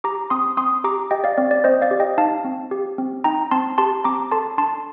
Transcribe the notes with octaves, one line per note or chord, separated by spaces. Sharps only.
G4 A#5 D6
C4 C6 D#6
C4 C6 D#6
G4 A#5 D6
G4 D#5 G5
D5 F5
C4 D5
D5
C4 C5 D#5
D5 F5
G4
D#5 G5
D#4 F5 A5
C4
G4
C4
D#4 G5 A#5
C4 A5 C6
G4 A5 C6
C4 A#5 D6
A4 A5 C6
D4 A5 C6